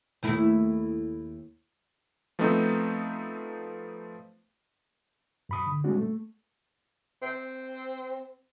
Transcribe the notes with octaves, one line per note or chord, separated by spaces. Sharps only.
D#2 A3 E4
F3 A3 B3 C4 D#4
F#2 B5 D#6
D3
G3 G#3 C4 D4 F#4
A3
C4